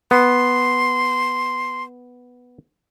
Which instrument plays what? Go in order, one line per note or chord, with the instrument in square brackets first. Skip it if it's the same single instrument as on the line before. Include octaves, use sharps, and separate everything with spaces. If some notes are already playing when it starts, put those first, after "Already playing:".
[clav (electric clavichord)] B3 [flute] C6